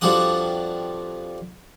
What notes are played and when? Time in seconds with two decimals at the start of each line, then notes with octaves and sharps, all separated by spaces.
0.01 F2 F3 G3 D4 F#4 D#6